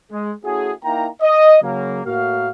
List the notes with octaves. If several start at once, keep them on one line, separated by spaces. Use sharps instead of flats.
G#3
A3 C#4 E4 F#4 G#4
A#3 D#4 E4 G5 A#5
D#5
C#3 F#3 A#3
A2 A#3 F#4 F5